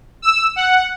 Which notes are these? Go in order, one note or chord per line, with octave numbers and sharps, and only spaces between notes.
E6
F#5